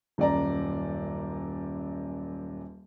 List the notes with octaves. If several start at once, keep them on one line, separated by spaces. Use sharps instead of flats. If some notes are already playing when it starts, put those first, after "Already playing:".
D#1 F#2 D5 A#5